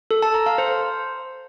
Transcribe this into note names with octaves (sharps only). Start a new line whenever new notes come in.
A4
A5
A#5
F5
C5